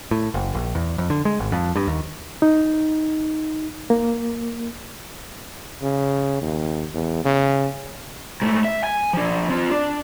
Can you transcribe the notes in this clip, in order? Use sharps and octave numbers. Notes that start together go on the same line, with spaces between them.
A2
F#1
A#1
E2
F2
D3
G#3
G#1
F2
G2
D#2
D#4
A#3
C#3
D#2
E2
C#3
G#2 A3
E5
G#5
F3 D4
C4 F4
D4